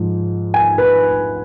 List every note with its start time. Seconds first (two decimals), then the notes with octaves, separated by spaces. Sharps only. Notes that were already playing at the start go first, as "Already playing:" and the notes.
Already playing: G#2 F3
0.54 G#5
0.78 B4